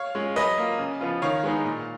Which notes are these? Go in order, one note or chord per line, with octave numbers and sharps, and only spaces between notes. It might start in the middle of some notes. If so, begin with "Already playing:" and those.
Already playing: C#5 F5
G#3 C#4 F4
F#3 B4 D#5
A#3 F4
C#3
F3 B3 F4
D#3 C#5 F5
G#3 B3 D#4
A#2